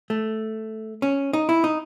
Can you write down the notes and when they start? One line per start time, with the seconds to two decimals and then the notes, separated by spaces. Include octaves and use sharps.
0.10 A3
1.02 C#4
1.33 D#4
1.49 E4
1.64 D#4